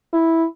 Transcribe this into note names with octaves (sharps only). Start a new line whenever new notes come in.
E4